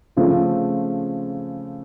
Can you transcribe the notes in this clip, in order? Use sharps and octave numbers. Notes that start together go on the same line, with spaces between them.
C#3 F3 A3 C4